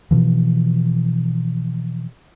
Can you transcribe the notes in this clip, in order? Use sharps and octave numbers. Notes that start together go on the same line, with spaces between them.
B2 E3 F3